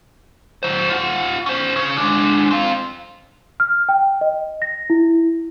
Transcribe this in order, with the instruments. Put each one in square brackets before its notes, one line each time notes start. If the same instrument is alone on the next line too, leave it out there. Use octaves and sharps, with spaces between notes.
[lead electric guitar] F#3 C5
F4 F#5
C#4 C5
C#3 C#4
G#3 D4
C4 F5
[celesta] F6
G5
D#5
A#6
E4